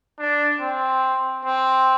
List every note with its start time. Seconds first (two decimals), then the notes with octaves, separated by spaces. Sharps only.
0.19 D4
0.61 C4
1.45 C4